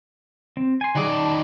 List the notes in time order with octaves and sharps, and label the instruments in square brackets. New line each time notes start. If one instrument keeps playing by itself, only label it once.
[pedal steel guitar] C4
G#5 C6
[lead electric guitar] D#3 D5 [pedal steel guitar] F#3 G#4
[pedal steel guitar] A5